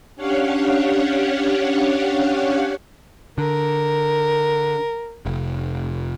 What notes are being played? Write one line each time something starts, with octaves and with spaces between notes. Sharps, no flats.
C#4 D4 G4 C#5 F5 F#5
D3 A#4
F1